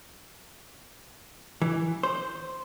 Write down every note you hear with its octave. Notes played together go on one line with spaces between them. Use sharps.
E3
C5